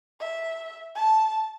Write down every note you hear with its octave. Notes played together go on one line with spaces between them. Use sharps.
E5
A5